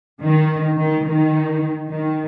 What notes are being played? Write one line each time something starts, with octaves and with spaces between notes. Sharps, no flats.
D#3
D#3
D#3
D#3